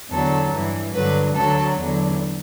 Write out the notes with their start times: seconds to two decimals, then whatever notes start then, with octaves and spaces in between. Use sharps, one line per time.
0.10 E2 D3 F#3 A4
0.52 G2 E3
0.94 G2 D3 F#3 B4
1.35 D2 D3 F#3 A4
1.77 E2 D3 F#3